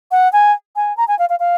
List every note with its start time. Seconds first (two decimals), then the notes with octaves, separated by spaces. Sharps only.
0.11 F#5
0.33 G#5
0.76 G#5
0.97 A#5
1.08 G#5
1.19 F5
1.30 F5
1.40 F5